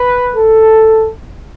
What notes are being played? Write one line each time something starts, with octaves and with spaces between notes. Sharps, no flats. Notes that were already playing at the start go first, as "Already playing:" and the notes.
Already playing: B4
A4